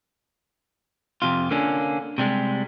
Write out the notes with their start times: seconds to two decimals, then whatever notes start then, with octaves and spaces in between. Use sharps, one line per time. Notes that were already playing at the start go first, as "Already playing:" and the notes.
1.22 F2 C3 F4
1.51 D3 A#3 C#4 D4
2.18 C3 G3 G#3